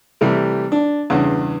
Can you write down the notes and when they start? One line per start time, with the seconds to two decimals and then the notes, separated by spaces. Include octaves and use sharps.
0.21 C3 E3 G3 A3
0.72 D4
1.10 E2 G2 C#3